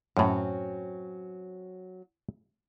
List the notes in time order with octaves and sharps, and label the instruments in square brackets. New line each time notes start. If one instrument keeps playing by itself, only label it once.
[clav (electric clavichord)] F#2 A2 [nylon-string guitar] F#3 C4 C#4